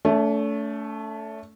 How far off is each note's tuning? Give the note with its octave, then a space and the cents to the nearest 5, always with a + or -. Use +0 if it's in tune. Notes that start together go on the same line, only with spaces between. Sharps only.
A3 +0 C#4 +45